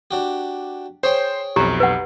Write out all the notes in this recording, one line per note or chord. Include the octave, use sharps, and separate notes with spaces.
D4 F#4 G4
G#4 C5 C#5 G5
B1 F2 G4 A#5
B4 F#5